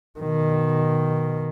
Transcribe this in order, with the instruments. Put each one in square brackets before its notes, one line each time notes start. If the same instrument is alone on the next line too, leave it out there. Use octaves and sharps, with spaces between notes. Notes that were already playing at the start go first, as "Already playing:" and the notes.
[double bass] B2 D#3